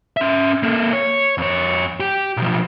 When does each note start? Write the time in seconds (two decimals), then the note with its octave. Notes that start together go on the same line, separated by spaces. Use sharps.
0.17 C#4 E5
0.63 A#3 A4
0.93 C#5
1.38 F2 C#5
2.00 G4
2.37 B1 F3